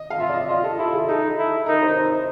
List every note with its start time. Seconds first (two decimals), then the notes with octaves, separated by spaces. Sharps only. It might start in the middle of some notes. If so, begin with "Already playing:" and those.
Already playing: D#5
0.10 F5
0.20 F4 E5
0.29 D5
0.34 D#5
0.49 F4 D#5
0.64 A4
0.78 E4 A4
0.93 G#4
1.08 D#4 A4
1.38 E4
1.66 D#4 A#4
1.82 C5
1.97 D#4 C5